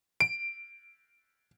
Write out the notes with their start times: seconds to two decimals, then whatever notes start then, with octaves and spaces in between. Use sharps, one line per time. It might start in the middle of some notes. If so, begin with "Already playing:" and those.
0.21 D7